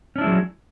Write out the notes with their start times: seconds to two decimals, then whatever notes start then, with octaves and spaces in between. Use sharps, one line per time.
0.16 C#4
0.18 D4
0.21 E4
0.24 G#3
0.26 F#3